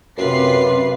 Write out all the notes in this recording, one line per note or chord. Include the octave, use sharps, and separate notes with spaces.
F#2 C3 F4 B4 C7